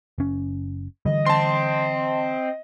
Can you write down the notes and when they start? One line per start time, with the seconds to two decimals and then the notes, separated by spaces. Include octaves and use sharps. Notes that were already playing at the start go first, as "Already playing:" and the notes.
0.18 F#1 C#4
1.05 D3 E3 G3 D#5
1.27 C4 A5 C6